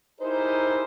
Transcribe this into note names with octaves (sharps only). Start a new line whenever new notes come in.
D#4 E4 G4 G#4 A#4 C5